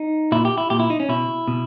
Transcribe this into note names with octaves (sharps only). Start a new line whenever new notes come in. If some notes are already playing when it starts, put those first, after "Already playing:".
Already playing: D#4
A#2 E4
G4
E4
A#2 G4
E4
D#4
C#4
B2 E4
B2